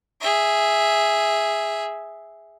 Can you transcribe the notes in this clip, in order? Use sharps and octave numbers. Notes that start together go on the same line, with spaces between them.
G#4 E5